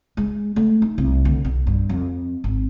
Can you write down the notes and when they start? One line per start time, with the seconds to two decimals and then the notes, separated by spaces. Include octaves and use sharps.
0.17 G#3
0.56 A3
0.82 D#4
0.98 C2
1.25 D2
1.45 B1
1.67 G2
1.89 F2
2.44 G#1